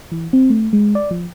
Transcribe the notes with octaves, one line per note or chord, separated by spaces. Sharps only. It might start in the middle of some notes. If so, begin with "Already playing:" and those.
E3
C4
A3
G#3
D5
F3